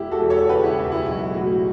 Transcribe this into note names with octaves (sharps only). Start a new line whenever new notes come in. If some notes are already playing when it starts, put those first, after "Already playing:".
Already playing: E1 E4 G4
F#4 A4
E2
A4 C#5
C#3 G4 B4
E4 G4
E1
E4
B1 E4
A2 F#4